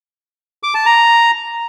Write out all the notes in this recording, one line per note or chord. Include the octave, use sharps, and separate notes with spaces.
D6
A5
A#5